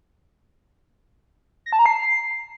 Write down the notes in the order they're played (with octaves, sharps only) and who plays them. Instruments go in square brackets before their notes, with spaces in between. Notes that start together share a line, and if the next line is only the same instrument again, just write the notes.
[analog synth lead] A#6
A5
A#5
C7